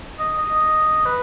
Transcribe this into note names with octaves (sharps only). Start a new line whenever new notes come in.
D#5
D#5
B4